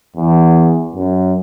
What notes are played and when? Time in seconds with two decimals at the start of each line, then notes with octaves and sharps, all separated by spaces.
0.16 E2
0.95 F#2